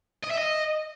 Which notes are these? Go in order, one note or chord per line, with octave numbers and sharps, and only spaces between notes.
D#5
E5
D#5